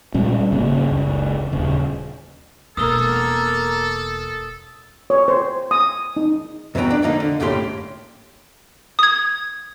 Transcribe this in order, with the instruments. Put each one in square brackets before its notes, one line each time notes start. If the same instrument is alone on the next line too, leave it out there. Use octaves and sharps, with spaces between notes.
[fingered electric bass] A#2 G3 G#3 C#4
G#1 C#3 A#3 C#4
F#1 C#2
D#1 C#3
[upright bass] E1 [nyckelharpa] A#3 A#4 [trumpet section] A4 [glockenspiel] D#6 E6 G7
[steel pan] C#5
C5
D#6
D#4
[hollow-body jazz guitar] F#2 B2 E3 B3 G5 A#5
D4 D5
F2 D3 A#3 D#4
D3
C2 F#2 A2 A#3 G4 C6
[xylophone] D#6 G#6